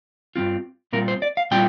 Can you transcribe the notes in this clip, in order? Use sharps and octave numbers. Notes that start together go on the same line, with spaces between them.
G2 G3 C4 F4
A#2 G3 C4 F4 A#4
C5
D5
F5
A#2 G3 C4 F4 G5